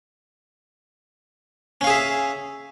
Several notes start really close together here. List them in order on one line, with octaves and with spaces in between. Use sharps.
C#4 F5 G#4 E5